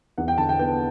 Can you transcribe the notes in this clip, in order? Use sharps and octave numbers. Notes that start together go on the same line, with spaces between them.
E2 F#5
G5
D3 A5
G5
B3 G5